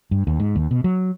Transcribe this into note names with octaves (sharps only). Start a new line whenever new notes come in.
G2
D#2
G#2
D#2
B2
F#3